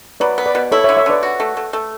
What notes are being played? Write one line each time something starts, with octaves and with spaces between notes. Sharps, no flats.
F#3 B4 D5
B3
B4 D5
B2
E4 A4 C#5
C#5 E5
D3
C#5 E5
D3 B4 D5
F#4
A3
A3
A3